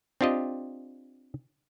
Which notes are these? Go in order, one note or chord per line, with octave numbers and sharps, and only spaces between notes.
C4 D4 F4 G4 D#5